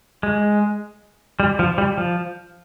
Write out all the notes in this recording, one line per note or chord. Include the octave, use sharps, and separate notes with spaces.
G#3
G3
F3
G3
F3